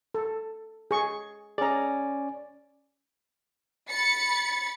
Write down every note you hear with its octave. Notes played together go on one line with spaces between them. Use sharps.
A4
G#4 C#6
C#4 G#4 D5 A#5
B5 A6 C#7